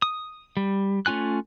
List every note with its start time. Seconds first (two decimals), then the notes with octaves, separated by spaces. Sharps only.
0.02 D#6
0.57 G3
1.06 A3 C#4 F4 G#5 F#6